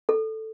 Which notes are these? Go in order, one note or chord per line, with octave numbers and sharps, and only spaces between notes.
A4